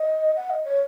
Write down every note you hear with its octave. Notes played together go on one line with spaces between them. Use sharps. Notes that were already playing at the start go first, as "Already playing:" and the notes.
Already playing: D#5
F#5
D#5
C#5